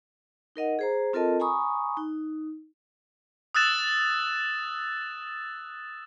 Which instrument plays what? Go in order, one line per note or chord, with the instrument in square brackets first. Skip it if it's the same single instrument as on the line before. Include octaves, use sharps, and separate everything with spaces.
[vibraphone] D#4 A#4 D#5 F#5
G#4 C5 A#5
C4 F4 A4 A#4 D#5 A5
G#5 A#5 B5 C#6 D#6
D#4
[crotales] D#6 E6 F#6 A6 E7